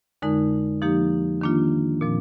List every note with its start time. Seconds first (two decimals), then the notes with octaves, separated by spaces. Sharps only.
0.22 F2 D3 G#3 D#4 A#4
0.82 F3 A#3 D#4 G4
1.41 D#3 A#3 D4 F4
2.01 A#2 F3 C4